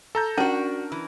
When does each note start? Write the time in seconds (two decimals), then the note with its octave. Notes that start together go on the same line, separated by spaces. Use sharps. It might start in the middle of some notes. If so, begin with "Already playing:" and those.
0.15 A4 A#5 G6
0.38 C#4 D4 F#4 A#4
0.92 E3